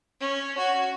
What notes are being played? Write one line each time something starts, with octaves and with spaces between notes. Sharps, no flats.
C#4
F#4